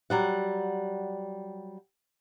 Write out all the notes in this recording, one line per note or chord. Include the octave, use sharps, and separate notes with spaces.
F#3 G3 F#5